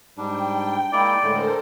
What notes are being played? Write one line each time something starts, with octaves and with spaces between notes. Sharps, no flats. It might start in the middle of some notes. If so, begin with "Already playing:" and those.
G#2 G3 D4 G5
G#3 A#3 E4 D5
A2 D3 G#3 A4 A#4 C5